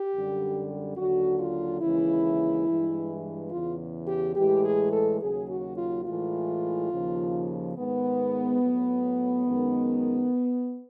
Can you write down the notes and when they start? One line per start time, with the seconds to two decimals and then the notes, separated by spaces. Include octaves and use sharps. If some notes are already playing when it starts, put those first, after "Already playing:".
Already playing: G4
0.12 F#2 D3 G3
0.97 D#2 D3 F#3 F#4
1.40 F4
1.82 D#2 C#3 E3 G#3 E4
2.67 G2 E3 G#3
3.51 E2 C#3 E3 F4
4.08 G4
4.36 A2 E3 G#3 G4
4.65 G#4
4.93 A4
5.20 D#2 C#3 F#3 G#4
5.50 F#4
5.78 F4
6.05 A2 E3 G#3 F4
6.91 D#2 C#3 F3
7.75 G#2 D#3 G#3 B3
8.60 A2 F#3
9.45 F#2 D#3 G#3